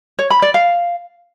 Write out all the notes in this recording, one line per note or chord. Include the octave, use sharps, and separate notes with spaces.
C#5
B5
D5
F5